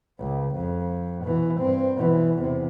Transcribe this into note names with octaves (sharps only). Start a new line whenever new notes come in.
C#2
F2
B2 E3
G2 C4
B2 E3
E2 C3